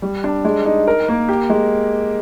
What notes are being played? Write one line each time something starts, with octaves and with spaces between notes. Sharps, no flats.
G3
D4
G#3
D#4
A#4
A#3
G4
G#3